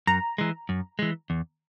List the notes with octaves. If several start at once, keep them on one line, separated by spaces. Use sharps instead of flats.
F#2 A#5
E3 G#3
F#2
E3 G#3
E2